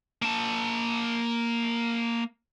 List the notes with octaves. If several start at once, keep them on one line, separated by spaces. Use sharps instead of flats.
A#3 A5